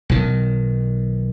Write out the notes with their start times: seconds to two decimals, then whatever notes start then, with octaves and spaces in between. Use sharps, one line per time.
0.10 B1 D#3